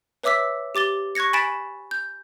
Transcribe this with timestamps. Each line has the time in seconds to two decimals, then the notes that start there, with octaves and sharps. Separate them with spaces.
0.23 B4 C#5 E5 D6 E6 B6
0.75 G4 D6 A6 G7
1.15 C#6 F#6 G#6 A#6 C#7
1.33 G#5 B5 A6 B6 D7 E7
1.91 G6